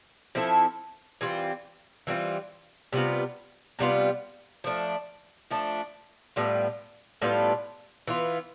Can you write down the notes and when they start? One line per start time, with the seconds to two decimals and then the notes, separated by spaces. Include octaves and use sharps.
0.35 F3 C4 E4 A4
1.21 E3 G3 C4 F4
2.07 E3 G3 C4 F4
2.93 C3 G3 B3 F4
3.79 C3 G3 B3 F4
4.64 F3 A3 D4
5.51 F3 A3 D4
6.36 A2 G3 B3 F4
7.22 A2 G3 B3 F4
8.08 E3 B3 F4